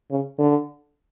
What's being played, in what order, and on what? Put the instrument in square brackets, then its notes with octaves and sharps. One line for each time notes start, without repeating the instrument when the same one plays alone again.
[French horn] C#3
D3